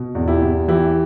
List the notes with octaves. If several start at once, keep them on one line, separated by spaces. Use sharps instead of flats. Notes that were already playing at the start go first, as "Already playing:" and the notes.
Already playing: B2
E2
E4 G4
E2
E3 E4 G4